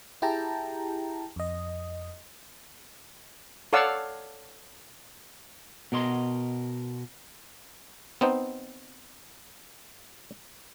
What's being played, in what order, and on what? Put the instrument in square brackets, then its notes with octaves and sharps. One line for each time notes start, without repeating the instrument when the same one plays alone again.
[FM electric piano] E4 G4 G#4 G5 A5 A#5
F2 D#5
[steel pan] A4 C#5 D5 F5 F#5 E6
[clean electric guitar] B2 A#4 D#5 C6
[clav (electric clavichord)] B3 C4 D#4 C5